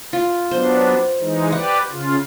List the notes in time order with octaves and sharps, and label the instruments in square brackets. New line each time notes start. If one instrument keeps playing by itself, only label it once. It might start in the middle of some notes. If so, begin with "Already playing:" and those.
[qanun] F4
[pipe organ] F#3 B3 D4 [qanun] C5
[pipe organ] E3 G#3 D#4
[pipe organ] G4 B4 D5 [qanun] F#5
[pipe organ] C#3 F4